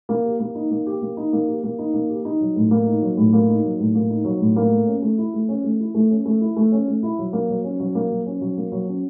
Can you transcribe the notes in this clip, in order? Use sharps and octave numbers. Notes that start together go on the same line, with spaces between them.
A#3
G4
A#3
D#4
A#3
G4
A#3
D#4
A#3
G4
A#3
D#4
A#3
G4
D#4
F#3
A2
A#3
D#4
F#3
A2
A#3
D#4
F#3
A2
A#3
D#4
F#3
A2
A#3
A3
C#4
A3
E4
A3
C#4
A3
E4
A3
C#4
A3
E4
A3
C#4
A3
E4
F#3
A#3
F#3
C#4
F#3
A#3
F#3
C#4
F#3
A#3
F#3
C#4